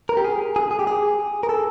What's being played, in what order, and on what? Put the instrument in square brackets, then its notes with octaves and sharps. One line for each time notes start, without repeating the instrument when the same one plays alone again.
[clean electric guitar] A#4
G4
G#4
G#4
G#4
G4
G#4
A#4
A4